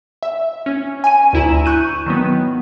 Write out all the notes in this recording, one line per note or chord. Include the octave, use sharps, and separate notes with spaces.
E5
C#4
G#5 D#7
D2 E4 A#5 E7
C#6 F#6 G6 D#7
D#3 F#3 B3